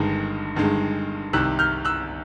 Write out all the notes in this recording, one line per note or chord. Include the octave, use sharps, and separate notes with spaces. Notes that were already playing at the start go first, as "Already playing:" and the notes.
Already playing: G1 G2 D#3 G#3
G1 G2 D#3 G#3
C2 C3 D#3 E6 F#6
F6 G6
E6 F#6